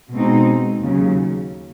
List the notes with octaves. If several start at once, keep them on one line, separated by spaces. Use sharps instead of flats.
B2 G#3 C4 D#4
D#2 C#3 F#3